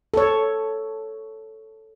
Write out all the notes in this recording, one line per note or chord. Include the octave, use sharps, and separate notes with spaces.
A4 C#5